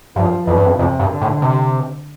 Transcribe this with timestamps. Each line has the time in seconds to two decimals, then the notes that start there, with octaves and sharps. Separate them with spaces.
0.16 G2 F3
0.47 F2 E3
0.56 G2
0.66 F2
0.79 F2 C3
0.99 G2
1.11 D3
1.22 A2
1.42 C3